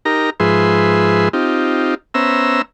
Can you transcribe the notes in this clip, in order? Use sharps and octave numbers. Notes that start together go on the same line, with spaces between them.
D#4 G4 A#4 A#5
G#2 F3 G#4 B4 E5 C6
C4 D#4 F4 G4
B3 C#4 C5 E5 A#5 E6